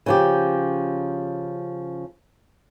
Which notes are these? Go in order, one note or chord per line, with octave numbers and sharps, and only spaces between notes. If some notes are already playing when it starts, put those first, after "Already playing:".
C#3 F3 G4